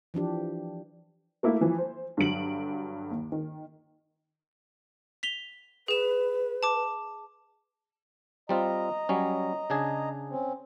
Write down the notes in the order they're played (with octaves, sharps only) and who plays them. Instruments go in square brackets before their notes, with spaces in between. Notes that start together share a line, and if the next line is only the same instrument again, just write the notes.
[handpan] E3 F3 D4 G4
[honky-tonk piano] A3 A#3 E4
E3 F3
C5
G2 D3 F#3 D7 F#7
D#2
D#3
[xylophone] B6 F7 G7
[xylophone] G#4 E7 [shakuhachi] B4
[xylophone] A5 D6
[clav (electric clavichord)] G3 C4 F4 [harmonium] D#5 A#5
[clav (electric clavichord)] F#3 G3 C#4
C#3 D4 G#4
[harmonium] C4 C#4